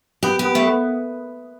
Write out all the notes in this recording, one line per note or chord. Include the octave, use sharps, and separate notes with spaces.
B3 G4
G4
B3
A3
B3